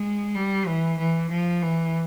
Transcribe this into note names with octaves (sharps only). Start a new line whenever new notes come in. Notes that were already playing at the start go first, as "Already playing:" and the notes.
Already playing: G#3
G3
E3
E3
F3
E3